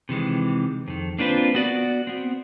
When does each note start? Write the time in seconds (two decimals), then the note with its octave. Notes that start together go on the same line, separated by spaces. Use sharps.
0.09 C3 D#3 E3 G#3
0.88 F2 D#3
1.19 A#3 C4 D4 F4 B4 C5
1.55 B3 F#4 D5
2.07 B3 C4